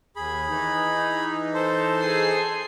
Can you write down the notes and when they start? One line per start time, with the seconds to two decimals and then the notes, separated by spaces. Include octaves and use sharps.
0.16 D#2 G#4 B5
0.50 E3 D#4
1.54 A4 C5
2.03 G#4 G#5 C7